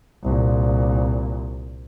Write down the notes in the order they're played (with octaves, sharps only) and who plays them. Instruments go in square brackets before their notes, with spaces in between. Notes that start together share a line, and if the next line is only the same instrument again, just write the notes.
[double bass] C2 A#2